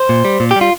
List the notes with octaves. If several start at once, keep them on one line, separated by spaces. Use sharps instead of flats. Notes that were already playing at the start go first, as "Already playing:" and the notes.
Already playing: C5
A#2
G3
A#2
G4
G3
F4